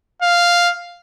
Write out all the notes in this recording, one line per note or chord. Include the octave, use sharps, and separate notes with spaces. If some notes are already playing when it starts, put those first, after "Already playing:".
F5